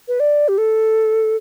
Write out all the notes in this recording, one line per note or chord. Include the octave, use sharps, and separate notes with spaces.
B4
D5
G4
A4